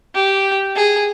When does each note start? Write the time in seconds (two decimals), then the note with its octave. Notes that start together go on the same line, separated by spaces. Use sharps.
0.14 G4
0.75 G#4